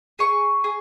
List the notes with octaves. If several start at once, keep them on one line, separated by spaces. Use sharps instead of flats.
G#4 C#6
G#4